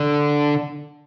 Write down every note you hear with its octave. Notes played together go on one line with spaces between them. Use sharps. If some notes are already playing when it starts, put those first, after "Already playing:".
Already playing: D3